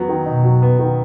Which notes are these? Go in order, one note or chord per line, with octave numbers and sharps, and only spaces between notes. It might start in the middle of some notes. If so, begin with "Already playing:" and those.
Already playing: F#3 B3
D#3
B2 D#4
F#3
B3
D#3